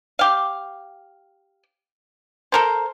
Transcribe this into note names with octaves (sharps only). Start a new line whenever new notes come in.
G4 F5
A4 A#4 C5